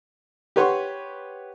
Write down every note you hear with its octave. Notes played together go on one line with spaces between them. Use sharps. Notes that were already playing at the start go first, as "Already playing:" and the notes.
G4 B4 C#5 F#5 C6 C#6